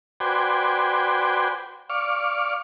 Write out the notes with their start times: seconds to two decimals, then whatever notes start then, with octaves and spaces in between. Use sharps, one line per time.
0.20 F#4 B4 C5 D5 G5 G#5
1.90 D5 F5 C#6